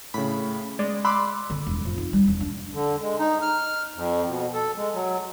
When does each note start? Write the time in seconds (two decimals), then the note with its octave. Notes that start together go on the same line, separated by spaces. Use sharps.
0.14 A2 C#3 B5
0.79 G#3 D5
1.05 B5 C6 D6 E6 F#6
1.50 D3
1.67 E1
1.85 F2
1.98 D#4
2.13 G3
2.27 E1
2.41 D4
2.74 D3
3.01 G#3
3.19 D#4
3.42 F6
3.94 F2
4.28 B2
4.54 A4
4.76 G#3
4.94 F#3